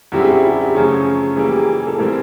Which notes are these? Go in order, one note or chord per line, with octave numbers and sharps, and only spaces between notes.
F#2 D3 G3 C4 E4 G4
G#4
G4
G#4
G4
F#2 C#3 F3 A3 C#4 G#4
E3 G3 A#3 G#4
G4
G#4
A4
A2 E3 G3 C4 A#4